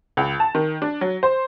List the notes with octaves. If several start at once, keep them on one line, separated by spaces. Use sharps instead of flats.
C#2
A5
D#3
D4
F#3
C5